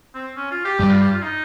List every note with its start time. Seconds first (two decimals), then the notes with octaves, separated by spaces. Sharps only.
0.15 C4
0.36 C#4
0.51 F4
0.65 G4
0.79 G2 G3 G4
0.90 F4
1.01 G4
1.12 F4
1.23 D#4